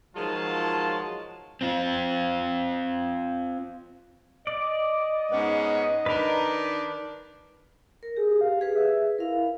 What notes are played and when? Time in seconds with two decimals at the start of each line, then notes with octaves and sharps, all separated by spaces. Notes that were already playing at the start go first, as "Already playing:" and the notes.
0.16 D#3 F3 F#3 G#3 F4 A5
1.61 C4 F4
4.47 D5 D#5
5.32 G#2 B3 C#4
6.06 D#3 D4 B4 A#5
8.03 A#4
8.17 G4 G#4
8.41 F5
8.61 G#4 B4
8.75 E5
9.18 E4 A#4 F5